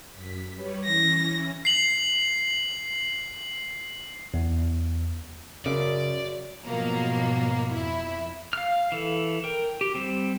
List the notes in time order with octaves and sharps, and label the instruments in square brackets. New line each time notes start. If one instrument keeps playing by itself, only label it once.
[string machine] F#2 B6
G3 B4 C#5
[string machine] E3 C#4 [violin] A#6
[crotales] C7 F#7
[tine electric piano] E2
[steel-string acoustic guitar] F#2 [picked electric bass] C#3 [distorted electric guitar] D5
[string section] G#2 B2 F3 F#3 A#3
F2 E4
[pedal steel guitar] F5 F6
E3 A4
A#4 G5
G4
G3 C4